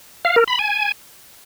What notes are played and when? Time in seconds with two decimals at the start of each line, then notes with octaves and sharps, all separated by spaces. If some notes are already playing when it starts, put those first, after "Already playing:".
0.25 F5
0.36 A#4
0.48 B5
0.59 G#5